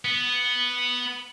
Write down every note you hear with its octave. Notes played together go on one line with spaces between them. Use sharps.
B3